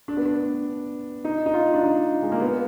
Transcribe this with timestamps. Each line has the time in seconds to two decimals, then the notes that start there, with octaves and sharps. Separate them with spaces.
0.08 D4
0.17 B3
0.26 D4
1.25 D#4
1.46 D#4
1.54 F4
1.74 D4
1.83 D#4
2.22 G#3
2.32 A#3
2.41 B3